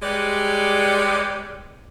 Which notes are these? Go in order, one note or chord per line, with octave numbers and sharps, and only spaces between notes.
G3 G#3 G4 B4 C#5 D5